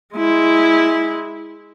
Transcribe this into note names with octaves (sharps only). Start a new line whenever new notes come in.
G#3 E4